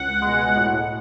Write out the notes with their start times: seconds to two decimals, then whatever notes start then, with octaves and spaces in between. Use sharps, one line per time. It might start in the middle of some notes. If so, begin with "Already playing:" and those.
Already playing: C#2 F#5
0.22 B2 G#3
0.56 A2